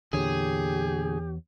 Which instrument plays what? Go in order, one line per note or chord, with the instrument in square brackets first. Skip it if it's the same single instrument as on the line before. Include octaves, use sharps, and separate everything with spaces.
[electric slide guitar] E2 C#5 [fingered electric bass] A#2 D3 [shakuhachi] G4 [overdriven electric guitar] G#4